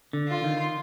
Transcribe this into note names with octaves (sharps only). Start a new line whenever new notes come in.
D3
F4
D#3